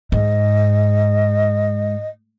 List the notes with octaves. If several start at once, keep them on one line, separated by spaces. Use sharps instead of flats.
G#2 D#5